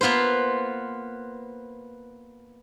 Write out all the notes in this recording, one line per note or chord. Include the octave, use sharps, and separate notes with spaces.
A#3 B3 F4 B4 C5